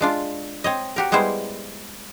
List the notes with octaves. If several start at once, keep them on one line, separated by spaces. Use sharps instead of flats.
G#3 D4 F4
C4 C#5 D#5
F#4 G4 A#4
G3 G#3 B3 E4 C5